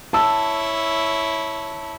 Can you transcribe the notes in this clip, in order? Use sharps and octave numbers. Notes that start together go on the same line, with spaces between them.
E4 C#5 A5 E6